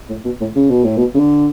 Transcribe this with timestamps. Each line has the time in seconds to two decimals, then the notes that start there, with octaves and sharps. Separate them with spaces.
0.09 A2
0.25 B2
0.41 A2
0.56 C#3
0.70 B2
0.84 A2
0.98 B2
1.15 C#3
1.19 D3